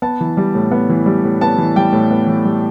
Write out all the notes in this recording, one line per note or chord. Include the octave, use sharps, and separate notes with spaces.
B3 A5
E3
G3
A2
B3
E3
G3
A2
B3 A5
E3
G3 G5
A2
B3
E3
G3